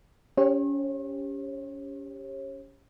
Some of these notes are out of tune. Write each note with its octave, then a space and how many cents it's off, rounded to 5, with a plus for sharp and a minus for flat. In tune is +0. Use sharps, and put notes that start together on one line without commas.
C#4 +25 G4 +15 C#5 -40